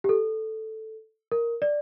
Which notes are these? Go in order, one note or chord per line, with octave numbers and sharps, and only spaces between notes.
G4
A4
A#4
D5